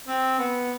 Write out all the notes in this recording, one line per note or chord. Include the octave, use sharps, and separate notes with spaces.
C4
B3